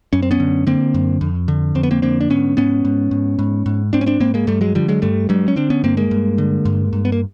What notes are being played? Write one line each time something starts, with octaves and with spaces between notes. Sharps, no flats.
F#2 C#4
C4
B3 C#4
D3
D3 A#3 C4
F#2
F2
D3
F2 C4
B3
A#3 C4
D3 A#3 C4
D4
G#2 B3 C#4
G#2 B3 C#4
G#2
G#2
G#2
G#2
G#2 C4 D4
C#4
C4 D4
G#2 A#3 C4
G#3 A#3
G2 G3 A3
F#3 G#3
D3 F3 G3
F#3 G#3
G2 G3 A3
G2 F#3 G#3
C#4
D3 C4 D4
B3 C#4
G2 A#3 C4
G#3 A#3
G2
D3
G2
G2
B3
A#3